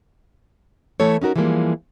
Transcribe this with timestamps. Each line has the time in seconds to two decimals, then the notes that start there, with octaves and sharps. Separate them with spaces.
1.00 E3 A3 E4 A4 C#5
1.22 C#4 D#4 F#4 A#4
1.36 E3 F3 G3 G#3 A#3